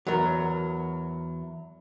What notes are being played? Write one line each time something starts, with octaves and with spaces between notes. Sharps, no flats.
E2 F#3 A#4